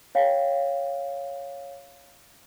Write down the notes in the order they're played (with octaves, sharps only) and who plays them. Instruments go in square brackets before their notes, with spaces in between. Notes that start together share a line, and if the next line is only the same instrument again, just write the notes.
[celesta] C#5 F5 G5